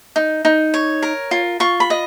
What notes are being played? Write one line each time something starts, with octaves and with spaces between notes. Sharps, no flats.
D#4
D#4
C#5
A#4
F4
F4 C#6
B5
D#5